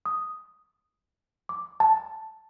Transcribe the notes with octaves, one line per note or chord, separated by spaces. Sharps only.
D#6
D6
A5